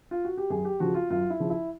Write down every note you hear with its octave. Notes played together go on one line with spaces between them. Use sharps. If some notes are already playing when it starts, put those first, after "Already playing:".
F4
F#4
G4
F#2 G#4
G4
C#3 F3 F#4
F4
F#2 F4
E4
C#3 F3
E4